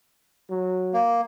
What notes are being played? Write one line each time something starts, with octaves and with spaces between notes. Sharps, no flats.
F#3
A#3